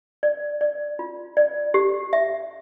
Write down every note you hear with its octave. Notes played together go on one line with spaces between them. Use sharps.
D5
D5
F4
D5
G4
E5